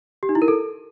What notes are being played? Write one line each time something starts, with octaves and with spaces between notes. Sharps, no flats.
G4
D#4
E4
A#4
A4